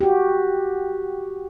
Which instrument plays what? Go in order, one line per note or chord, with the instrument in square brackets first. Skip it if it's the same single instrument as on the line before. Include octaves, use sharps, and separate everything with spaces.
[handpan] F#4 G4